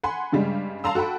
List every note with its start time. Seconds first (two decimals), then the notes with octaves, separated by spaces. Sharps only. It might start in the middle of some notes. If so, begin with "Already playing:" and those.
0.04 F#5 G#5 B5 C6
0.32 G2 C#3 G3 G#3
0.84 F5 A5 A#5 C6 E6
0.95 F#4 A4 F#5 G5 B5